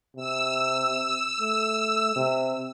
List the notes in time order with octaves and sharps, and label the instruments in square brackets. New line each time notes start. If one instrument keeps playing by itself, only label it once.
[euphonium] C3 [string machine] E6
[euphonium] A3
C3